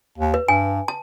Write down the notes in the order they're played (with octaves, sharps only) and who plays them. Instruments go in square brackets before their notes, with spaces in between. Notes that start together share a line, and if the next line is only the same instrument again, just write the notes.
[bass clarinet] D#2
[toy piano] B4
[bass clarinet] G2 [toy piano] G#5
[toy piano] A5